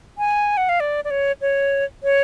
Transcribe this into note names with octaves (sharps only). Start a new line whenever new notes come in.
G#5
F#5
F5
D5
D5
C#5
C#5
C#5